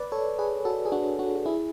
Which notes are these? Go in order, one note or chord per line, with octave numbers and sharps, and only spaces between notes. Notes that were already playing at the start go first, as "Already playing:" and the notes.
Already playing: B4 D5
A4 C#5
G#4 B4
F#4 A4
G#4
D4 F#4
D4 F#4
F#4
E4 G#4